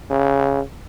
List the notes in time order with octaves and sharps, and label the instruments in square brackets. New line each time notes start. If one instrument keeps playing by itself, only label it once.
[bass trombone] C#3